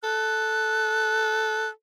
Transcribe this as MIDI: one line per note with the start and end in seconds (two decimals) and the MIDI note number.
0.04 1.69 69
0.04 1.69 90